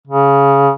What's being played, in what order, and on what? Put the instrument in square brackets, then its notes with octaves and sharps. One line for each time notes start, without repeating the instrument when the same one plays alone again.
[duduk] C#3